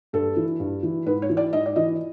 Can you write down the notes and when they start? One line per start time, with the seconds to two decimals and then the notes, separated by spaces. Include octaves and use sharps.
0.13 G2 A4
0.37 E3
0.60 G2
0.83 E3
1.06 G#2 B4
1.22 C#5
1.29 E3
1.37 D5
1.53 G#2 D#5
1.66 D5
1.76 E3 D#5